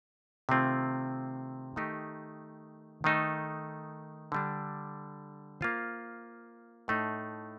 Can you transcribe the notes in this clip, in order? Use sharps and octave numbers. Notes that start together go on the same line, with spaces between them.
C3 D#3 A3 C4 F4
D#3 A3 D#4 G4
D#3 A3 D#4 A4
D3 G3 D4
A#3 F4 C5
A2 A3 D#4